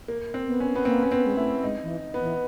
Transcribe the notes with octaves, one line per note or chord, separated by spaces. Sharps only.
A#3
C4
B3
C#4
B3
A#3 C4
C#4
B3 C4
G#3
A3 E4
G#3 D#4
E3
B3
E3